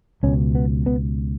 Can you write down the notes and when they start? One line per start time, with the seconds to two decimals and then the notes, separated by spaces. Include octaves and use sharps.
0.23 C#2 B2 C#4
0.55 B3
0.86 B3